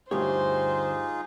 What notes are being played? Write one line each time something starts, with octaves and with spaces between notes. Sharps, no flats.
D2 G2 D#4 F4 G4 G#4 C5 C#5